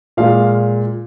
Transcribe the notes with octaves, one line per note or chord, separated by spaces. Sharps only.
A#2 G#3 F5